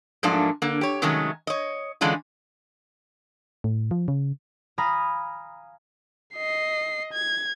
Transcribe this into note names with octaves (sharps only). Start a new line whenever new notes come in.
G#2 F3 F#3 A3 A#3 D4
D3 A#3
G4 C#5
C3 D#3 F#3 G#3 A3 C#4
C#5 D#5
D3 E3 G#3 C#4 D4 F4
A2
F3
C#3
F5 G#5 A#5 B5 D#6 F6
D#5 C7
G#6